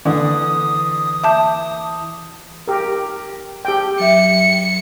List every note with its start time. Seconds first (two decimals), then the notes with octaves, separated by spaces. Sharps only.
0.05 D3 E3 D#6
1.24 E5 A5 D6 G6
2.68 G4 A#4
3.65 G4 G5
4.00 F#3 E5 C#7